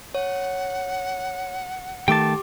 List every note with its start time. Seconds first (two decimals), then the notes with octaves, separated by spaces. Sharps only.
0.15 C#5 F#5
2.08 D#3 A3 G4 G5 A5 D6